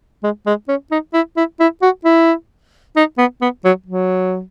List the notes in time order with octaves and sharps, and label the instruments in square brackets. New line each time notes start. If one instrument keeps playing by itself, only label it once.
[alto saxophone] G#3
G#3
C#4
D#4
E4
E4
E4
F#4
E4
D#4
B3
B3
F#3
F#3